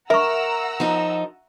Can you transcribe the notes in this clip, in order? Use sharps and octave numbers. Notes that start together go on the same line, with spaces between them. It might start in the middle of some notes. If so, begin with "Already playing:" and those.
A#4 E5 F#5 A#5 C#6 E6
F3 D#4